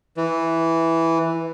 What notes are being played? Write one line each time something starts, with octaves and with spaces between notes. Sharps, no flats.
E3